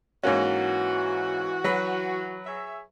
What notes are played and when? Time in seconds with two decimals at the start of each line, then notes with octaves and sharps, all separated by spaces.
0.23 G#2 E3 A#3 C#4 F#4
1.64 F#3 B4 B5
2.46 G#4 C#5 E5